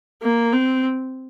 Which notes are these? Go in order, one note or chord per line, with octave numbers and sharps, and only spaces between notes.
A#3
C4